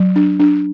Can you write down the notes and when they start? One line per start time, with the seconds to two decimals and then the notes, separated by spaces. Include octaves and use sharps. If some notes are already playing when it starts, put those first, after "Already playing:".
Already playing: F#3
0.16 D4
0.40 D4